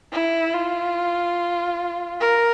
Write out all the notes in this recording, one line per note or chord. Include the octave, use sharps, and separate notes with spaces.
E4
F4
A#4